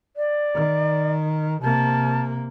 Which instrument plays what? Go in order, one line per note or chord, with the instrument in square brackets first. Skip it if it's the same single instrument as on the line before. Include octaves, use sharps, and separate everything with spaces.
[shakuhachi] D5
[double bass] D#3
[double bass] C3 A#3 [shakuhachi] A5